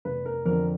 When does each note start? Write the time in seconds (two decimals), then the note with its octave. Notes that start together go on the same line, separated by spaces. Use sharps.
0.05 F1 B4
0.26 A#4
0.46 F2 D3 A#4